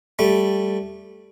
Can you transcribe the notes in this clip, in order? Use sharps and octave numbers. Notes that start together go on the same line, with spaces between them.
G3 A3